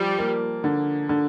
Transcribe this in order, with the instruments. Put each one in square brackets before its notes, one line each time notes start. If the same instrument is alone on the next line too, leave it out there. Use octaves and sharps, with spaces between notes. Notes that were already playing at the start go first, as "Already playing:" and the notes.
Already playing: [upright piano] F3 [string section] G3
[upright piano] A#3
D3
D3